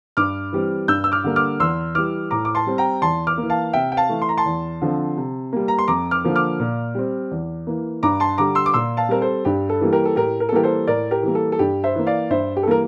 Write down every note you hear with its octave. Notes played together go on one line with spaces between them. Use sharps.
G2 D6 F6
E3 G3 C4
G2 E6 G6
E6
D6 F6
D3 G3 A#3
D6 F6
E2 C6 E6
E3 G3 D6 F6
A2 A#5 D6
D6
A5 C6
G3 C4
G5 A#5
E2 A5 C6
D6 F6
A#3
E3
F5 A5
C3 E5 G5
G5
F5 A5
E3 A3
C6
A#5
A5 C6
E2
D3 F3 C4
C3
G3 A#3
A#5
C6
F2 A#5 D6
D6 F6
D3 F3 A#3
D6 F6
A#2
G3 C4
E2
E3 A#3
G2 A#5 D6
A5 C6
D3 G3 A#5 D6
C6 E6
D6
A#2 C6 E6
F5 A5
G3 C4 A#4
A4 C5
G2 G4
A4
E3 G3 A#3
G4 A#4
A4
A2 G4 A#4
A#4
A4
E3 G3 A#3 G4 A#4
A4 C5
A2 A#4 D5
G4 A#4
E3 G3 A#3
A4
A4
G2 G4
C5 E5
E3 A#3
D5 F5
G2 C5 E5
G4
A4
E3 G3 A#3 A#4